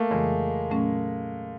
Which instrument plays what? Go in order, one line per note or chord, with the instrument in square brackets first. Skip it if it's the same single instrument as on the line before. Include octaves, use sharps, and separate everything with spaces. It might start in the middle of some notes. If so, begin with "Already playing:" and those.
Already playing: [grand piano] A3 A#3
[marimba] F2 C#3 E3 [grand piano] G#3
[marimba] A#2 F#3 A3 C#4